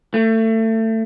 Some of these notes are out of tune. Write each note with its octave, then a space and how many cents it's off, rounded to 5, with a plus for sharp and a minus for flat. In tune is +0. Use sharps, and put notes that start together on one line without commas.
A3 +25